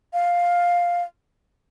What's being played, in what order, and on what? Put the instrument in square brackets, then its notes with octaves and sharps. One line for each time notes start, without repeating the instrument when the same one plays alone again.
[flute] F5